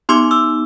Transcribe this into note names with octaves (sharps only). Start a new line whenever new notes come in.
B3 D#4 G4 C6 D6
D6 E6